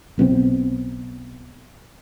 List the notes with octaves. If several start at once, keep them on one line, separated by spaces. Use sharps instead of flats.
B1 B2 E3 C4